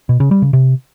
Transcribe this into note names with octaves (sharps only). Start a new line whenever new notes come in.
B2
C#3
G3
C#3
C3